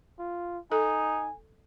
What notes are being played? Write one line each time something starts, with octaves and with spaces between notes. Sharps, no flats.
F4
D#4 A4 G#5